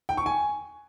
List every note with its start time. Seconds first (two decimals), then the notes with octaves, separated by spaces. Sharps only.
0.09 G5
0.17 C#6
0.26 G#5